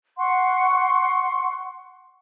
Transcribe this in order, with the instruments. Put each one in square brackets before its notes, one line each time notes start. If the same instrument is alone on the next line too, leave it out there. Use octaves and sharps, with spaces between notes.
[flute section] F#5 C6 C#6